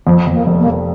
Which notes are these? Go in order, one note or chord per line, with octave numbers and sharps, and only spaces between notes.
F2 F3
F2
A#3
F1
A#3
F1